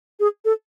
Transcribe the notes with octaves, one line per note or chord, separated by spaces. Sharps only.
G#4
A4